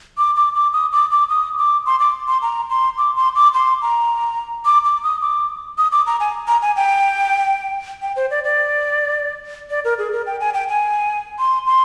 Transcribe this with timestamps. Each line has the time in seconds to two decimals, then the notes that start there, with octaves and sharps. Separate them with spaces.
0.18 D6
0.36 D6
0.55 D6
0.73 D#6
0.92 D6
1.11 D6
1.30 D#6
1.58 D6
1.86 C6
2.00 D6
2.28 C6
2.42 A#5
2.70 C6
2.98 D6
3.16 C6
3.35 D6
3.54 C6
3.82 A#5
4.65 D6
4.85 D6
5.04 D#6
5.22 D6
5.78 D#6
5.92 D6
6.07 A#5
6.20 G#5
6.48 A#5
6.62 G#5
6.76 G5
8.02 G5
8.16 C5
8.31 D5
8.44 D5
9.70 D5
9.84 A#4
9.98 G#4
10.12 A#4
10.26 G5
10.40 G#5
10.54 G5
10.68 G#5
11.39 C6
11.66 C6